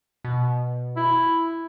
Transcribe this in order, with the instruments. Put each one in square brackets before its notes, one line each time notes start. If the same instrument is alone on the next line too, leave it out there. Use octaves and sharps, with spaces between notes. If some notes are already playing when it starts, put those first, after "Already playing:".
[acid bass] B2
[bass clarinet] E4